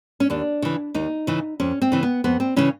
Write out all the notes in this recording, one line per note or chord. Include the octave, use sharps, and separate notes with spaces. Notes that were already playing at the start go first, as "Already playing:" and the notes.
C#4
D#2 D4
C#3 E3
D#2 D#4
C#3 E3
F2 C#4
C4
C#3 E3
B3
F2 B3
C4
C#3 E3 C#4